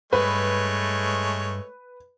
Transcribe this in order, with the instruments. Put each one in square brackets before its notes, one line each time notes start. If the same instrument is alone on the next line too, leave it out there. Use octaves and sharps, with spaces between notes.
[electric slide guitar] G2 [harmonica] G#3 A3 C#5 [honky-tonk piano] B4